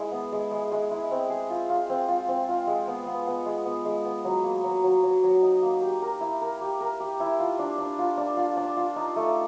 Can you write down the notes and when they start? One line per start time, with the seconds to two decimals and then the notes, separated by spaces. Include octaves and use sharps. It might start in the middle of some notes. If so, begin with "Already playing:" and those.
Already playing: G#3 E4
0.12 B3
0.33 G#3
0.51 G#3
0.72 G#3
0.91 E4
1.11 C4
1.30 G#4
1.50 F4
1.70 F4
1.90 C4
2.09 F4
2.28 C4
2.48 F4
2.67 G#3
2.88 B3
3.07 B3
3.27 B3
3.46 G#3
3.66 B3
3.85 G#3
4.05 B3
4.25 F#3
4.44 A#3
4.64 F#3
4.84 F#3
5.04 F#3
5.24 F#3
5.42 D#4
5.62 A#3
5.81 G4
6.02 A#4
6.21 E4
6.41 A#4
6.61 G4
6.80 A#4
7.00 G4
7.20 E4
7.39 F4
7.59 D4
7.78 D4
7.99 F4
8.17 D4
8.37 F4
8.57 D4
8.77 F4
8.96 D#4
9.16 A3